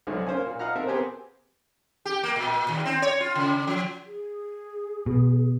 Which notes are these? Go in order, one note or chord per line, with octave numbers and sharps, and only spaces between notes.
C2 D3 F#3 G#3 A3
A#3 C#4 C5 F5 G#5
A#2
D#5 F5 F#5 A#5 F6
C4 A4 A#4 E5
B3 C4 G4 G#4 A#4 C5
G4
A#3
A#2
D#2
C4
C#5
F4
C#3
F3
G#4
B2